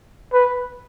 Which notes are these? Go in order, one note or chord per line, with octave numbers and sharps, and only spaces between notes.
B4